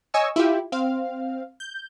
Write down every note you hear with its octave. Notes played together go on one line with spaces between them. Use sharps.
C#5 D#5 G#5 C#6 E6
E4 F4 G4
C4 F5
G6